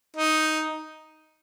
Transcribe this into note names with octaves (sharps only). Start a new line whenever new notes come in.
D#4